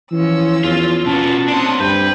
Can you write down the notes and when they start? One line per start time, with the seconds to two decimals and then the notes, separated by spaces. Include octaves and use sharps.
0.12 E3 F3 C#4 E6
0.64 E2 F4
1.06 B2 B3 C#4 F4 F#4 A5
1.48 C4 D4 F#5 C6 D#6
1.80 D2 G2 G3 C4 B4 G6